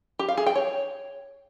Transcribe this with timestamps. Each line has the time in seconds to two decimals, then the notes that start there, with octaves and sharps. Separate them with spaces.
0.19 G4
0.28 F5
0.38 G#4
0.47 G5
0.56 C#5